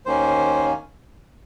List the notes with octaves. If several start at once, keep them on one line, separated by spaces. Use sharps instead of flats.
D#2 D#3 A#3 C#4 C5